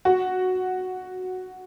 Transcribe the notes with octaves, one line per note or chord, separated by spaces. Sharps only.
F#4